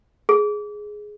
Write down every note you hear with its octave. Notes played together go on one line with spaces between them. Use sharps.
G#4